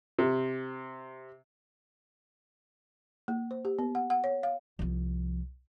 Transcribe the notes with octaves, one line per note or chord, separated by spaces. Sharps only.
C3
A#3
C5
G4
B3
F#5
F#5
C#5
F5
C2 F3